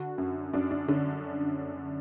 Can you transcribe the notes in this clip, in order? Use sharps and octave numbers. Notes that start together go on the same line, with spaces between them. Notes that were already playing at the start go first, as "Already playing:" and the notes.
Already playing: D3 F#4
F#2
F#2 D4
D4
D3 C#4